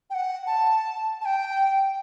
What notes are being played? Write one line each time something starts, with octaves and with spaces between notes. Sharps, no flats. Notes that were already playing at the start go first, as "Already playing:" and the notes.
G5
F#5
A5
A5
G5